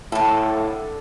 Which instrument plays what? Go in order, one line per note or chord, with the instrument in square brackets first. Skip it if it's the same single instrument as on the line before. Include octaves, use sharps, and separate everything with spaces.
[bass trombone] A2 [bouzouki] D3 A4